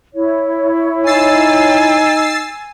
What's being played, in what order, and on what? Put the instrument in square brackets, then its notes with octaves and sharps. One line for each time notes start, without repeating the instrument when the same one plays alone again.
[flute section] E4 C#5
[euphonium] D#4 [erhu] G#5 [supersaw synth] E6 A6 C7